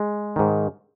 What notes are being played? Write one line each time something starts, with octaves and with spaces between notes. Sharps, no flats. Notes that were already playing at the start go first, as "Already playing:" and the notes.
Already playing: G#3
G#2 D#3